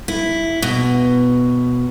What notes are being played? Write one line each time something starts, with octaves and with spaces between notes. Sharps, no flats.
E4
B2